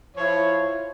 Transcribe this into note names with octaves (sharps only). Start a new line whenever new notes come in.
F3 E4 C#5